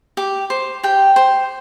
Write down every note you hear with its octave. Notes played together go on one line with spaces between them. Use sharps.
G4 D6
C5
G4 G5
C5